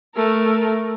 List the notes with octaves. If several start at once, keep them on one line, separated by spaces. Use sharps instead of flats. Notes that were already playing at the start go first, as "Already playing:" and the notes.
A3 A#4